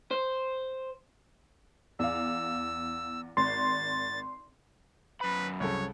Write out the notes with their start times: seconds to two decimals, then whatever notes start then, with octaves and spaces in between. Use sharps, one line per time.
0.11 C5
1.99 E2 F5 E6
3.37 G#1 C6 A6
5.21 F#2 B4 B5
5.60 C2 C#3 A4 C#5